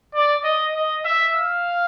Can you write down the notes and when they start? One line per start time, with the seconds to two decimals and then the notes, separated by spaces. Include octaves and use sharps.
0.15 D5
0.44 D#5
0.75 D#5
1.05 E5
1.36 F5